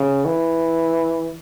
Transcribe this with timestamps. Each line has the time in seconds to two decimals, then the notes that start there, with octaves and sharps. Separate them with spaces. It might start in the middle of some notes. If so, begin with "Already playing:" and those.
Already playing: C#3
0.25 E3